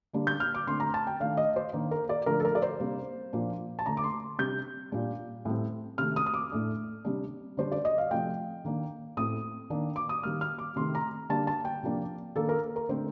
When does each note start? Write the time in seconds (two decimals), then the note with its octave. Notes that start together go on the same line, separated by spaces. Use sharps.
0.13 D3 G3 A#3 D4
0.27 G6
0.40 F6
0.54 D6
0.67 D3 A3 C4 C6
0.80 A#5
0.94 A5
1.07 G5
1.20 D#3 A3 D4 F5
1.37 D#5
1.56 C5
1.73 D#3 A#3 D4
1.91 A#4
2.09 D5
2.26 D3 F3 A3 D4 A#4
2.40 A4
2.45 A#4
2.55 D5
2.62 C5
2.80 C3 G3 A#3 D4
3.33 A#2 F3 A#3 D4
3.79 A5
3.86 D3 A3 D4 A#5
3.97 D6
4.04 C6
4.39 C3 G3 D4 G6
4.92 A#2 G3 D4
5.45 A2 G3 C4
5.98 C3 D#3 A3 F6
6.16 D#6
6.26 D#6
6.34 D6
6.52 A2 A3 D4
7.05 C3 G3 D4
7.57 D3 G3 D4 C5
7.72 D5
7.85 D#5
7.98 F5
8.11 C3 F3 A3 G5
8.65 D#3 A#3 D4
9.17 A2 A3 C4 D#6
9.70 D#3 A#3 D4
9.96 D6
10.09 D#6
10.23 D#3 G3 A#3 F6
10.41 F6
10.58 D6
10.76 C3 D#3 A3 C6
10.95 A#5
11.29 D3 G3 A#3 D4 A5
11.47 A5
11.65 G5
11.83 C3 F3 A#3 D4
12.36 D#3 A#3 D4 A4
12.49 A#4
12.76 A#4
12.89 D3 A3 C4 C5